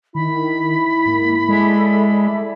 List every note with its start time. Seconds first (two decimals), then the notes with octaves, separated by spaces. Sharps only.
0.15 D#3 E4 B5
1.05 G#2 A#3
1.49 G#3 A4 D5 E5